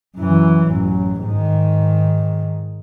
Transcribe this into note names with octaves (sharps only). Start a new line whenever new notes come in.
F#2 E3
A1 F#2
G#2 D#3